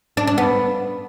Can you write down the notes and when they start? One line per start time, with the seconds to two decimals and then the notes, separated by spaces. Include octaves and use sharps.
0.17 D4
0.27 D4
0.38 B3